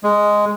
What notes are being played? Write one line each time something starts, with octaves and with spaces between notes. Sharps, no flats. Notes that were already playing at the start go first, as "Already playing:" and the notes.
G#3